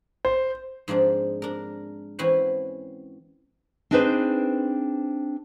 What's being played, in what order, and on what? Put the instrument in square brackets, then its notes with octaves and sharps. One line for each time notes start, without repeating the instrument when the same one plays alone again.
[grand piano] C5
[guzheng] G#2 F3 C4 D4
D4 A#4
E3 C4 C#4 F#4 B4 C5
[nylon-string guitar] C4 D4 D#4 G#4 B4 C5